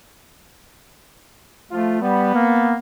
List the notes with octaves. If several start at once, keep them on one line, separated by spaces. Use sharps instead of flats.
F3 A3 F4
G3 B3
A#3